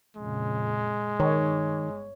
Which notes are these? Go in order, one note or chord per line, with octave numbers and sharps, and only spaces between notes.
F2 A#2 C#3 G#3
G1 D#3 C#5